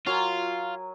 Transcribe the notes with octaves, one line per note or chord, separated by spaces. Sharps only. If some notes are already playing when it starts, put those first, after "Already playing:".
F#3 F4 A#4 G#5